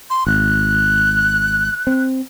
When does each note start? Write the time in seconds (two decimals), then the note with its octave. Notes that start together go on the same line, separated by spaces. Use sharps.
0.10 C6
0.27 G#1 F#6
1.87 C4